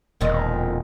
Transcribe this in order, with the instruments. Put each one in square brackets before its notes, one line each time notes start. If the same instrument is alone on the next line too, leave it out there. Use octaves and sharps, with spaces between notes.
[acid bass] E1 [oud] F2 A#2 D#3